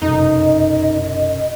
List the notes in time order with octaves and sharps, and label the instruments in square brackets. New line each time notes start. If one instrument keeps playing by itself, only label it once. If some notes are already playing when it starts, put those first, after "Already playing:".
[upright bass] F1 B1 [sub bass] F#2 [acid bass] D#4 [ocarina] D#5